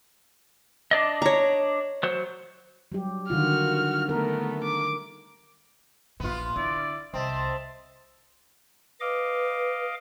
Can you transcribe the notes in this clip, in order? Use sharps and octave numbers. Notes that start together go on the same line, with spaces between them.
D4 D5 D#5
C#5 A#5
F#3 C5
F#3 G3 G4
D3 D#3 F4 F#4 F6
A3 B3 A#4
D6
A#1 A#2 B3 F4
D3 E4 D5
C2 C4 D#5 E5 A5
B4 D#5 F5 D6